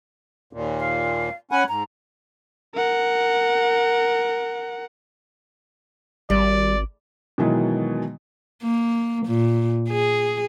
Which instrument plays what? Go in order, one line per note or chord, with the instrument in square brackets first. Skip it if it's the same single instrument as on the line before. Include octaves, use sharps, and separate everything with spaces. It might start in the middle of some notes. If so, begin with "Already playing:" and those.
[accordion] D#2 A#2
[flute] F5
[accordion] C#4 F#5 G#5 [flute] B5
[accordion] G#2 [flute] A#5
[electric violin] A#4 F#5
[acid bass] G#1 [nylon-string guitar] G3 [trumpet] D5
[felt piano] B2 D#3 E3 F#3 G#3
[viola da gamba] A#3
A#2
G#4